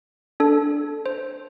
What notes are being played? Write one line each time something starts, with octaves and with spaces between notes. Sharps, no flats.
D4 A4
C5